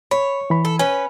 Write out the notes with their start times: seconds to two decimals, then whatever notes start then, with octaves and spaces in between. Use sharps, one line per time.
0.11 C#5 B5
0.50 E3 B5
0.65 A4
0.79 C#4 B4 G#5